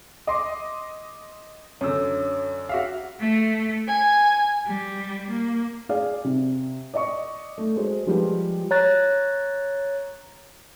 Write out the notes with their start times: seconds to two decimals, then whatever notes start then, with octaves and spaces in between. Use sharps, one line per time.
0.27 D#5 C6 D6
1.81 F#2 D3 C#5 E6
2.69 F#4 E5 F5
3.19 A3
3.88 G#5
4.67 G3
5.29 A#3
5.89 G#4 D5 F5
6.24 C3
6.94 D5 D#5 C#6
7.58 A3
7.76 G#3 F#4 C5
8.06 F3 G3 G#3 F4 G4 B4
8.71 C#5 A#5 F#6 A6